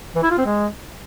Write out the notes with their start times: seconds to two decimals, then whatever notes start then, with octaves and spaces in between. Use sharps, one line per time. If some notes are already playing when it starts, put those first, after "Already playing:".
0.16 E3
0.23 E4
0.31 F4
0.38 C4
0.46 G#3